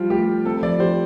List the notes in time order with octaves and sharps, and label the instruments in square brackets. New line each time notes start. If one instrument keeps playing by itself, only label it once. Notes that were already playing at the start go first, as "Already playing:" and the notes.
Already playing: [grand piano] F3 G3 F4
[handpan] A3 [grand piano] G4
[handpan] G4
[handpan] C4 [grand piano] A4
[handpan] F3 [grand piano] D5
[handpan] G4 [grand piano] C5